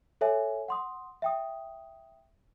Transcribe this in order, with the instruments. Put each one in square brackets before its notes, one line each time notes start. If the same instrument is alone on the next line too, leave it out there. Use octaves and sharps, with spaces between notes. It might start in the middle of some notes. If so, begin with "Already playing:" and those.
[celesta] A4 C#5 E5 G#5
F#5 C6 D#6
E5 G5 D#6